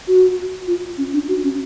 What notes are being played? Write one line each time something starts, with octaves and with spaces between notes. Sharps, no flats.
F#4
F4
C#4
D4
F#4
C#4